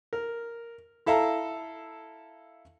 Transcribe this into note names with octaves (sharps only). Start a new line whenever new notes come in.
A#4
E4 A4 E5 F5 A#5